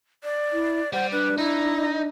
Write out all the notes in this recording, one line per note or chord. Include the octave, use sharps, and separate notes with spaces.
D5
E4
G3 C5 F#5
D4 B4
D#4 E4